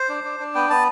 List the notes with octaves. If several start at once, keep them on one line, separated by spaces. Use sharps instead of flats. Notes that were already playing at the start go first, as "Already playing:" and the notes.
Already playing: C5
D4
D4
D4
B3 G5
B3 A5